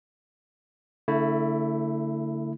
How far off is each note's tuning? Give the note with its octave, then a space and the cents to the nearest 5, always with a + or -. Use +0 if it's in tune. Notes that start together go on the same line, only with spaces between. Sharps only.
D3 -35 A3 +25 E4 +0